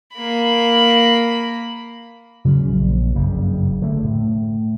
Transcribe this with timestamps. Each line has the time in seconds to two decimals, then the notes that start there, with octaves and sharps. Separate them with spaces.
0.14 A#3 B5
2.45 C#3 F#3 G#3 C#4
2.69 A#1
3.15 F#1 G2 C#3
3.82 D3 A3
4.04 A2